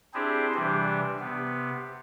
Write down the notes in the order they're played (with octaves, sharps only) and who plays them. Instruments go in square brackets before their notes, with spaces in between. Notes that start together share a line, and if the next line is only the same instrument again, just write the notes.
[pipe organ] C4 D4 E4 G4 G#4 C5
C3 E3 G3 D4
C3 B3